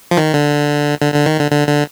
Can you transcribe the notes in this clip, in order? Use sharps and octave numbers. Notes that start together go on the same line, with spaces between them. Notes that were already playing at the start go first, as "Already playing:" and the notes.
F3
D#3
D3
D3
D3
D#3
D3
D3
D3